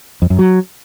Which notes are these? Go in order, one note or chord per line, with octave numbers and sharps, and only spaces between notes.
F2
F#2
F#3